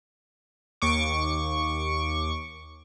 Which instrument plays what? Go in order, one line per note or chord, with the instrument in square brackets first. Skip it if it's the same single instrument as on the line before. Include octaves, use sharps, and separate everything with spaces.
[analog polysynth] D#2 C#6 D6